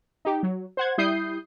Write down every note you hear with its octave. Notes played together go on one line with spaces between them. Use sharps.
D#4 G4
F#3
C5 F#5 G#6
G3 E4 D#6 G6 C7